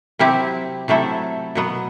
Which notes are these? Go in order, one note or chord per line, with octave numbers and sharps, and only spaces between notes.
C3 F#3 C4 E4 G4
C3 F#3 A3 E4 A4
B2 F#3 B3